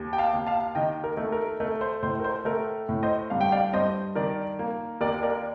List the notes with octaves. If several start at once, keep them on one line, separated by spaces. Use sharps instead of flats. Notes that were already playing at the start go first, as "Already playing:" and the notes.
Already playing: D#2
G5
F5 A5
D#2
F5 A5
D#3 D#5 G5
A#4
A3
A#4
A3 A#4
C5
A2 C5
A#4
C5
A3 A#4
A2
C5 D#5
G2 F5
G5
D5 F5
G2 C5 D#5
D#3 A#4 D5
A#3
D#2 A#4 D5
A#4 D5